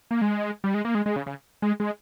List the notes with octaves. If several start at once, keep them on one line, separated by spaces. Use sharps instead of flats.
A#3
G#3
G3
G#3
A#3
G#3
G#3
C#3
C#3
G#3
G#3